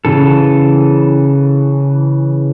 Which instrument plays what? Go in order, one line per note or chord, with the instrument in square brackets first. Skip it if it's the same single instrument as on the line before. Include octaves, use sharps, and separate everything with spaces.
[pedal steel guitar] C#3 E3 A4